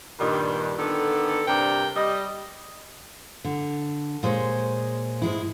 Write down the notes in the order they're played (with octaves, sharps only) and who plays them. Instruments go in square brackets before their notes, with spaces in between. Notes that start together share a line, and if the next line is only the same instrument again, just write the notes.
[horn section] G2 A#2 D#3
D3 D#3 B3 A4
G2 C3 D4 A#4 G5
G3 D#5
[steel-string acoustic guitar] D3
A#2 G#3 C5 C#5
G#2 G#3 E4